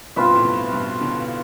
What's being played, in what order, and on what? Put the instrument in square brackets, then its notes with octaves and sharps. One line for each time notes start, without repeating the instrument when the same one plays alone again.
[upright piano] G2 B2 [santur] C4 F4 B4 E5
[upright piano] A2
G2 B2
G2 B2
B2 D3